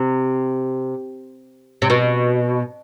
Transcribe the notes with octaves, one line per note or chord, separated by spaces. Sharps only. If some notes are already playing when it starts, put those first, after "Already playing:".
Already playing: C3
C3
B2